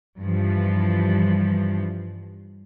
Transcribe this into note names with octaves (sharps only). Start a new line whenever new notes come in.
G2 E3 F3